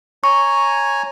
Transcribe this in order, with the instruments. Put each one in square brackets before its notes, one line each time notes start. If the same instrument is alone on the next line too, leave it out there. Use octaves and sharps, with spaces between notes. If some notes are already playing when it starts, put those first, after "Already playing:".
[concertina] C#5 G#5 A#5 [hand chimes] C#6